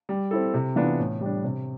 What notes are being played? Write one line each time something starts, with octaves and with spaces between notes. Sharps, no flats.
G3
C4 E4 A4
C3
E3 B3 D4 F4
A2
G3 D4
C3